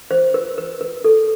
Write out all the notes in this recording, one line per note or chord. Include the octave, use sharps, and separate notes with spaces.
C5
B4
B4
B4
A4